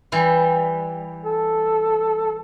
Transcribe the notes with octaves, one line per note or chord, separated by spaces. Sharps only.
E3 G3
A4